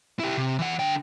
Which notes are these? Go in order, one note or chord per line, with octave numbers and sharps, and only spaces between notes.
E4 G4
C3
E3 F#5
D3 G5